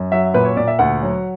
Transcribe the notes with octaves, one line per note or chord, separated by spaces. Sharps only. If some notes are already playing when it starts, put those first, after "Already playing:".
Already playing: F#2
F#3 E5
A#2 B4
C#5
A#2 D5
E5
D2 F#5
F#3